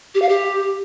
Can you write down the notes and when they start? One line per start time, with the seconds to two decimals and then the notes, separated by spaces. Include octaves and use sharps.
0.15 G4
0.22 F5
0.29 G4